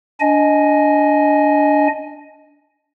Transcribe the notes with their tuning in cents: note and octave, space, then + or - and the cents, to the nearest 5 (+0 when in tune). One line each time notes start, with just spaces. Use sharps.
D4 -15 D#5 +0 G#5 +10